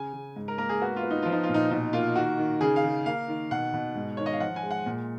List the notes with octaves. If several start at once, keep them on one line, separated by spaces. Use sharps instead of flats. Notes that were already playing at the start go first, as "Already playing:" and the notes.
Already playing: C#3 G#5
C#3
G#2
A#4
A#3 A#4
G#4
B3 F#4
F4
B3
D#4
F3 F4
D#4
F4
A#2
D#4
B2 D#4
A#3 F4
D#3 F#4
D#3
C#3 G#4
F5
C#3
A#3 F5
D#3
B2 F#5
B2
G#2
D#3 C#5
D#5
F5
F3 F#5
G#5
G#3
F#5
A#2